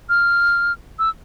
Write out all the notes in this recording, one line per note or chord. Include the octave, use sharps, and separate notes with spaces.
F6
E6